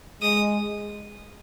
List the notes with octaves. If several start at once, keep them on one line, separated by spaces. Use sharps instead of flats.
G#3 D#6